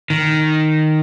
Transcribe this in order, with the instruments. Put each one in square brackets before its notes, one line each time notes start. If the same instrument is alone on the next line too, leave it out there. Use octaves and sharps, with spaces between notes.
[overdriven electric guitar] D#3